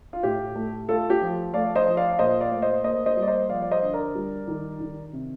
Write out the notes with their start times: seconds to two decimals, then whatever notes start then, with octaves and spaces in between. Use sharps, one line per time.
0.13 F4
0.23 A2 G4
0.55 A3
0.89 A3 F4 A4
1.10 G4
1.21 F3
1.54 A3 D5 F5
1.76 C5 D#5
1.87 F3
1.97 D5 F5
2.13 F5
2.19 A#2 C5 D#5
2.41 D5 F5
2.51 A3
2.62 C5 D#5
2.84 A#3 C5 D#5
3.06 C5 D#5
3.17 G3
3.22 D5
3.28 C5 D#5
3.49 F3 D5 F5
3.62 D5
3.71 C5 D#5
3.83 D3
3.93 A#4 D5
4.15 G3
4.47 D#3
4.80 D#3
5.13 C3